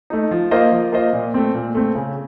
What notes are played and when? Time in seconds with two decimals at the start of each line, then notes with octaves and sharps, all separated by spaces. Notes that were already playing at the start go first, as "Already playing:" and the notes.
0.10 A3 D#4
0.31 F3
0.51 A#3 F4 C5 D#5
0.72 F3
0.92 A#3 F4 C5 D#5
1.13 A#2
1.34 A3 C4
1.54 A#2
1.75 A3 C4
1.95 C#3